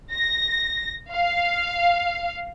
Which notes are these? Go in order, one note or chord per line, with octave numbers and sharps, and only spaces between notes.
A#6
F5